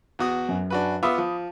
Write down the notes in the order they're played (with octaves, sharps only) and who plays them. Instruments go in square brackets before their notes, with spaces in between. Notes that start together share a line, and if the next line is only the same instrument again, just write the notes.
[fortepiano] E2 F#4 D#6
[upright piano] F#2
[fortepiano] D4 F#4 B4
[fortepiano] B3 F4 E5 [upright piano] B5 D6 D#6
[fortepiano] F3